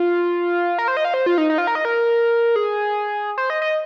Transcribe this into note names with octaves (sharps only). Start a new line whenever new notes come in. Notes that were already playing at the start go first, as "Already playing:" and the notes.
Already playing: F4
A#4
C5
D#5
F5
C5
F4
D#4
D#4
F4
A#4
D#5
A#4
G#4
C5
D#5
D#5